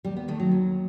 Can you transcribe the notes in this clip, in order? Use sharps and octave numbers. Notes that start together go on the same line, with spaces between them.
D#2 G3
B3
D#3 A3
F#3
D#2